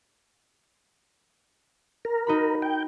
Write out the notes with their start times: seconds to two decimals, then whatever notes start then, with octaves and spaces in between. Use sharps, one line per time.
2.05 A#4
2.27 D#4 F#4 B5
2.62 G5